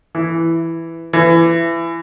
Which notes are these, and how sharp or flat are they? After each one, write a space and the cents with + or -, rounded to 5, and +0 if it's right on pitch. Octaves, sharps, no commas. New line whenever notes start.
E3 +5
E3 +25